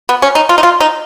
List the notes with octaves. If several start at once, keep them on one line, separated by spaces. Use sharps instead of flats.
B3
C#4
D#4
F4
D#4
F4
D#4